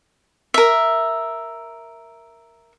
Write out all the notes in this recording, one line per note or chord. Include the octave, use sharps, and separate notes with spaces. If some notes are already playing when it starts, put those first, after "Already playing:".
A#4 E5